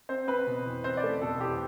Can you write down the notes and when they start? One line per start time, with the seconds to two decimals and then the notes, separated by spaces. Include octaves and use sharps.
0.09 C4 C5
0.27 C4 B4
0.47 B2
0.66 E2
0.84 C4 C5
0.97 D5
1.03 A3
1.21 B2 A4
1.40 E2 G4